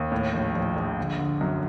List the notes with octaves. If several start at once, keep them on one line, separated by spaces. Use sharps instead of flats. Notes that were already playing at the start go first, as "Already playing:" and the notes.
Already playing: D#2
A2
A#1
A#1
A#1
D3
D3
F#2